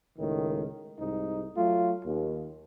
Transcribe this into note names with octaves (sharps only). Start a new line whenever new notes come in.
C#2 A2 D#3
C2 G#2 D#4
F#3 A3 F4
D#2